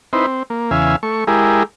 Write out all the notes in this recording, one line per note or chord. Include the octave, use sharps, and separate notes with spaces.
C4 D#4 E4 B4 C5
C4
A#3
E2 C#3 E5 F5 G#5
A3 C#6
G#3 E4 G4 G#4 A#4